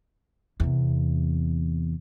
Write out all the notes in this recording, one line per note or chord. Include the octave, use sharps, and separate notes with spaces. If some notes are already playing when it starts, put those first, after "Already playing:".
E2 C3